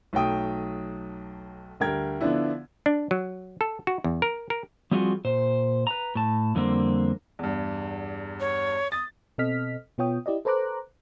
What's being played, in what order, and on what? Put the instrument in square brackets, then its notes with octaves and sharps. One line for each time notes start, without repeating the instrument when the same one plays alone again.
[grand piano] B1 F#3 A3 G5 D#6
D2 G3 A#4 G5 G#6
D3 F3 B3 D4 E4
[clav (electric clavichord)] D4
F#3
A4
F#4
E2
A#4
A#4
[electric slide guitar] F3 G3 C4 F4 F#4 G#4
A#2 C5
B4 A#5
A2 A5
F2 D3 G3 A#3 C4
[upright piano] E2 G2
[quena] C#5
[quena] D#6 [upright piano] A6
[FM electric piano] B2 C4 A4 D#5 F6 B6
B2 B3 F4 C#5 G5 D#6
E4 G4 D5 D#5
A4 B4 C5 A#5 D6 F#6